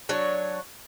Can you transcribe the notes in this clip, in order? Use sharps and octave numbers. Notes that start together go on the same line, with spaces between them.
F#3 D4 C#5